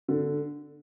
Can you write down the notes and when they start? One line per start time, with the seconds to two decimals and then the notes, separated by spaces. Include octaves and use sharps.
0.08 D3